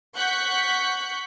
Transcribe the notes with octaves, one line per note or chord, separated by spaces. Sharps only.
F#5 C#6 F#6 G6 B6